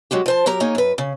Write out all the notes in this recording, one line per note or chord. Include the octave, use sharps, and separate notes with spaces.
F#3 G#3 F#4 G4
F3 C5 A5
F#3 G4 A#4 A#5
A#3 D#4 G#4 C#5
F#2 B4
C#3